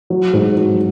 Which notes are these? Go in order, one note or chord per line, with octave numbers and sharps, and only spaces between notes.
F#3
G#2
F#3